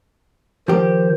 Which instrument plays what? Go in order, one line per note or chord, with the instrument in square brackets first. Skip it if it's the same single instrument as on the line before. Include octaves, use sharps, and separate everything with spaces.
[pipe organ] D#3 C5 [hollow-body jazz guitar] F3 G4